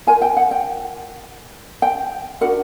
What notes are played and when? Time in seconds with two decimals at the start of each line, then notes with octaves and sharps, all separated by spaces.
0.07 F4 A#4 G#5
0.22 G5
0.37 F#5
0.51 G5
1.82 G5
2.41 D4 F#4 A#4 F#5